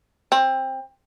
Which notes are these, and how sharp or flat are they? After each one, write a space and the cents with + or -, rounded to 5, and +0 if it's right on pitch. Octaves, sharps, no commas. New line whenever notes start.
C4 +20